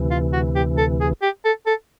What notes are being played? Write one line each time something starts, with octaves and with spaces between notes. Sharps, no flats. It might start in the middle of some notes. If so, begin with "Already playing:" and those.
Already playing: D2 C3 E3
F4
F#4
G4
A4
G#4
G4
A4
A4